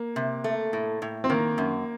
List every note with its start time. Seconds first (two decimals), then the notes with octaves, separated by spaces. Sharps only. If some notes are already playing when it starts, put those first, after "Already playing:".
Already playing: A#3
0.16 C3
0.44 A3
0.73 A2
1.02 A2
1.24 C4
1.30 D#3 A#3
1.58 F#2